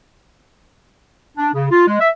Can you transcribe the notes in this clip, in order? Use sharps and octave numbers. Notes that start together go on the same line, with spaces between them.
D4
C#3
F4
G#3
E5